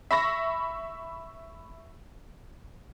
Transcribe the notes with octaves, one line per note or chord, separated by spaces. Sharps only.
E5 B5 C#6 A#6